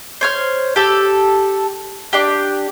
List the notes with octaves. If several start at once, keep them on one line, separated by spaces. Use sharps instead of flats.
C5 C#5 F6
G4 A4
D4 G4